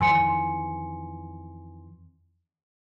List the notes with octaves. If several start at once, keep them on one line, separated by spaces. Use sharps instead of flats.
F2 D#3 E3 G#5 C6 C#7